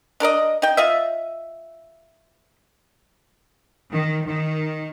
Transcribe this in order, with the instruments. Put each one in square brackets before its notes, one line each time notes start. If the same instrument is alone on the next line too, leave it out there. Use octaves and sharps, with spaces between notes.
[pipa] D4 A#4 D5 D#5
D#4 G5
F4 D#5 E5
[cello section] D#3
D#3